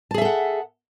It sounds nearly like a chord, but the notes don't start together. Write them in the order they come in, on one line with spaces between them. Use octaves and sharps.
A5 G#4 E5 A4 F#5